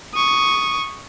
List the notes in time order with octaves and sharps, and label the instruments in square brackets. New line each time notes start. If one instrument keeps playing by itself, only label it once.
[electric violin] C#6 D#6